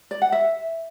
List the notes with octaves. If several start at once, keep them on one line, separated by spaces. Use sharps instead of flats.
D5
F#5
E5